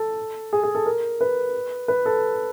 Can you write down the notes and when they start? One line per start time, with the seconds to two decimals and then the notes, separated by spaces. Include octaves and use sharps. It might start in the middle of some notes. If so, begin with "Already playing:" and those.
Already playing: A4
0.53 G#4
0.63 G#4
0.75 A4
0.86 A#4
1.21 B4
1.88 B4
2.06 A4